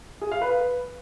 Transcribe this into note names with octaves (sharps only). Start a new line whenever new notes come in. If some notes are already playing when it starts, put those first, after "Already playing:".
G#4
F5
B4